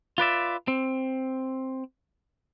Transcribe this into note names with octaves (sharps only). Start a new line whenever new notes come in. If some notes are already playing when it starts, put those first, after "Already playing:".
F4 B4 D5 E5
C4